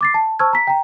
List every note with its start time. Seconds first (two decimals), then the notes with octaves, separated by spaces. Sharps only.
0.01 D6 A6 C7
0.14 A5
0.39 C5 A5 C#6 E6 F6 G#6
0.53 A#5 B6
0.67 G5 A#5